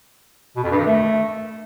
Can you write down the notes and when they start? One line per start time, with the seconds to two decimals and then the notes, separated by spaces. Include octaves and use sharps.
0.56 B2
0.64 F2
0.71 G2
0.79 D#3
0.86 A3